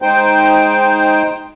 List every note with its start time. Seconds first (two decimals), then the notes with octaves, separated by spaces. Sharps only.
0.02 G#3 D#4 C5 G5